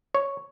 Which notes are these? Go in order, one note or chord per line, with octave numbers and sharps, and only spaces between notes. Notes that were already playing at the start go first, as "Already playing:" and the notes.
C#5